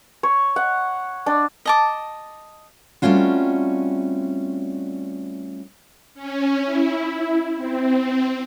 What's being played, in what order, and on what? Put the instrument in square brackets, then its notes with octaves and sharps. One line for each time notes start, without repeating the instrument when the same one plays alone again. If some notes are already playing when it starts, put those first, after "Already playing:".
[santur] C#5
F#5
D4
[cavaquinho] D#5 A5 D6
[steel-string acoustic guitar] G3 A3 C4 C#4 F4 F#4
[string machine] C#4
E4
C4